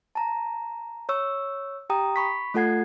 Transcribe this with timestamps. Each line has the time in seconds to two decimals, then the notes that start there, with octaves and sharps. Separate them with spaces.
0.15 A5 A#5
1.09 C#5 C#6 E6
1.90 G4 G5 A#5 D#6
2.16 B5 C#6 B6
2.54 A3 F4 A4 F#5 G#6 C7